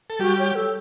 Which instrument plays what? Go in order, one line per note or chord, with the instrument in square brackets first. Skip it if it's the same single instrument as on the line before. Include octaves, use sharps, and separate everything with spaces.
[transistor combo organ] A4
[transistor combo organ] G3 G4 [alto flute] F#4
[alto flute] C#5
A4